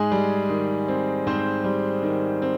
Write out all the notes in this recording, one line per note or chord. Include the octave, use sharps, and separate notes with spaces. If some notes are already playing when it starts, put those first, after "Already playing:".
Already playing: G#2 G#3 G#4
G3
D#3
C4
G#2 C4 C5
G3
D#3
C4